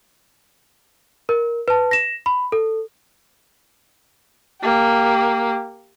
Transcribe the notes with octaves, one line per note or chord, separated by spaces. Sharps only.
A#4
B4 A5
A#6 E7
B5
A4
A#3 G4